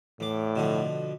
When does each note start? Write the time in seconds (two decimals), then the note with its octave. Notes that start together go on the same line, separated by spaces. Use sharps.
0.20 E2 A2 D6
0.55 B2 D3 F3